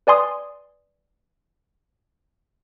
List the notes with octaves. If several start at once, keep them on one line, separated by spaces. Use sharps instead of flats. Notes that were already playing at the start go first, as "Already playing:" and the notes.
B4 D5 G#5 C6 D#6